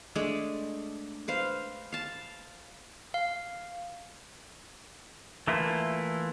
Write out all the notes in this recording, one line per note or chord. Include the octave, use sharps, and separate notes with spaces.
G#3 A3 D4
B4 C5 F5
F5 A5
F5
E3 A3 A#3 E4 F4